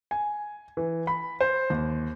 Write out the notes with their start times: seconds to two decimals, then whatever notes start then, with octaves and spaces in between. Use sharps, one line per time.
0.11 G#5
0.77 E3
1.07 B5
1.41 C5
1.70 D#2